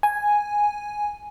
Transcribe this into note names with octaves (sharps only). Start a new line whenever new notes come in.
G#5